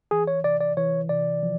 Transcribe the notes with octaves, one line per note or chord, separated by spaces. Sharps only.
E3 G#4
C#5
C3 D5
D5
E3 C#5
C3 D5
F3